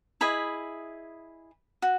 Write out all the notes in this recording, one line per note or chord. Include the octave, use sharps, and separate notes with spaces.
E4 G#4 D#5 B5
F#4